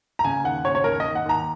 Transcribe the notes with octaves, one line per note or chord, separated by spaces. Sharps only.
A#5
C#3 G#5
D#2 F#5
C#3 C#5
C#5
D#2 A#4
D#2 D#5
F#5
D#2 A#5